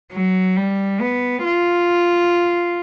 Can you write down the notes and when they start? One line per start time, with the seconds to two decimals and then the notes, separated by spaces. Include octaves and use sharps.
0.12 F#3
0.56 G3
1.00 B3
1.44 F4